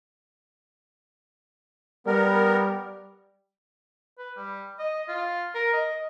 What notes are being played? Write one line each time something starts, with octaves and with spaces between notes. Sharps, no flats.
G3 B3 A#4
B4
G3
D#5
F4
A#4
D#5